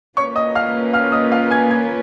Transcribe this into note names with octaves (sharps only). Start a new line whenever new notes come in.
A#3 C#4 F4 B4 C#5 C#6
D#5 D#6
F5 F6
F5 F6
D#5 D#6
F5 F6
G#5 G#6
G#5 G#6